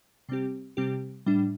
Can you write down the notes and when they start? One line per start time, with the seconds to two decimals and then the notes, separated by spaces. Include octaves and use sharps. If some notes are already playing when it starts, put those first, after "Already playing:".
0.29 C3 G3 C4 G4
0.77 C3 G3 C4 G4
1.26 A2 G3 D4